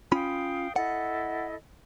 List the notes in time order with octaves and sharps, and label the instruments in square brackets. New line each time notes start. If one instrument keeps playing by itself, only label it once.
[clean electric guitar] C#4 F4 B5 [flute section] F5 G5 D#6
[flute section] E4 A4 D#5 [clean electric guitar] F#5